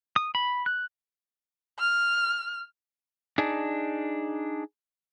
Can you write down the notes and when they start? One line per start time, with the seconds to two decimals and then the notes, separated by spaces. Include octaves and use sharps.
0.16 D#6
0.35 B5
0.66 F#6
1.79 F6
3.38 D4 D#4 G#4